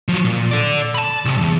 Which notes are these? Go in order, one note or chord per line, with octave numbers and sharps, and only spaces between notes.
F3 F#3
A#2
A4 D5
A5 B5
C2 C3
E2 G2